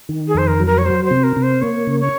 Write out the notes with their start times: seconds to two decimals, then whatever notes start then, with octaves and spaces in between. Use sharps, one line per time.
0.09 D#3
0.28 G#4
0.35 F2 C5
0.47 A#4
0.60 F#3
0.66 A#4
0.78 C#5
0.85 F#3 C5
1.04 C5
1.11 C3
1.23 A#4
1.36 C3
1.42 C5
1.61 A#3 C#5
1.87 C#3
2.00 C#5